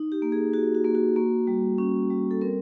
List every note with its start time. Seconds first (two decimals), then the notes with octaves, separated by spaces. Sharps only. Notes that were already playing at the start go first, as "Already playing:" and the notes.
Already playing: D#4
0.12 G4
0.22 A#3
0.32 G#4
0.53 F#4 G#4
0.74 F#4
0.85 A#3
0.95 F#4
1.16 A#3
1.47 G3
1.78 C#4
2.10 G3
2.31 A4
2.41 C4 A#4